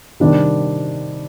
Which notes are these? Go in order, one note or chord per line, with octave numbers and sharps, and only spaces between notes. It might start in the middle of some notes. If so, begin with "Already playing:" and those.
C3 D#3 G3 D4